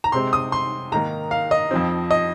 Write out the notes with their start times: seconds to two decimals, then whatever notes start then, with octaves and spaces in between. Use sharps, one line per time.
0.04 A#5
0.12 C3 G#3 C4 C6
0.33 D#6
0.52 C6
0.92 G#2 D#3 A#3 A#5
1.31 F5
1.51 D#5
1.71 F2 F3 C4
2.11 D#5